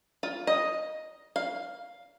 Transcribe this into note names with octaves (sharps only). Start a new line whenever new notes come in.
F4
D#5
F5